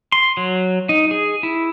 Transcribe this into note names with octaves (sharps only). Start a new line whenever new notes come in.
C6
F#3
D#4
G#4
E4